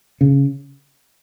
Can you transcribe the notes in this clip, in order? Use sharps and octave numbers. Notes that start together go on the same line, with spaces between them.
C#3